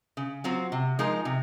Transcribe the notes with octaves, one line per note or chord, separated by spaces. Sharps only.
C#3
F#3 C4 F4
C3
F3 G#3 D#4 A#4
C3